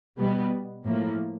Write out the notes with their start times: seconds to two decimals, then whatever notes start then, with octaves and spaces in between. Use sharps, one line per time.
0.18 B2 G3 B3
0.84 A2 F3 A#3